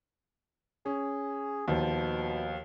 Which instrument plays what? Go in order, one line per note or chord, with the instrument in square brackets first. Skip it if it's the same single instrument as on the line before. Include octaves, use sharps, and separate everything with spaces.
[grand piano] C#4 [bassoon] G#4
[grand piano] D#2 F3 [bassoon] B2